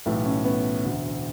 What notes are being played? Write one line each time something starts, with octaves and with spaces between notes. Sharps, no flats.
B1 A2 E3 A3
C#4
B3
E1 D2 D3